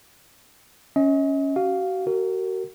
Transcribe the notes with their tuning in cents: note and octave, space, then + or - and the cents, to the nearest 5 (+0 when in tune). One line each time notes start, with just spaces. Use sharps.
C#4 +0 D#5 +40
F#4 +35 F5 +0
F#4 +35 A#4 -25